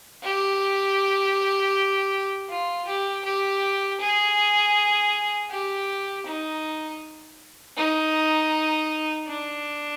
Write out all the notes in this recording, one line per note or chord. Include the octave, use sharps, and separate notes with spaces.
G4
F4
G4
G4
G#4
G4
D#4
D#4
D4